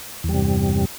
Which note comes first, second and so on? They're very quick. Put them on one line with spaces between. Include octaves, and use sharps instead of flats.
E2 G3 C3 G2